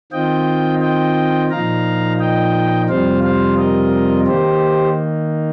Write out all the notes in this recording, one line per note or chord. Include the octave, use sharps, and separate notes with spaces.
D#3 C4 F4 D#5 G5
D#5 G5
A#2 F3 D#4 F5 A#5
D#5 G5
F2 C3 G3 C4 F4 C5 F5
C5 F5
A#4 D#5
D#3 A#3 D#4 G4 C5